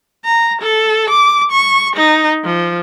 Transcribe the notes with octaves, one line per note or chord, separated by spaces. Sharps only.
A#5
A4
D6
C#6
D#4
F3